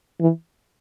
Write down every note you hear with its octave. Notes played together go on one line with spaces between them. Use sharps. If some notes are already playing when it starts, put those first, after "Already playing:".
E3